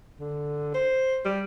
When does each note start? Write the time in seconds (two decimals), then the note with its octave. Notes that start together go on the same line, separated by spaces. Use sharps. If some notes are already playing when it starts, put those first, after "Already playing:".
0.20 D3
0.74 C5
1.25 G3